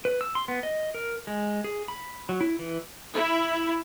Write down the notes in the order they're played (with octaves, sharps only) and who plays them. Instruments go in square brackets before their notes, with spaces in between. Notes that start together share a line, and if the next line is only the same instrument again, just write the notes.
[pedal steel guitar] B4
E6
C6
B3
D#5
A#4
G#3
G#4
B5
F#3
E4
E3
[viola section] E4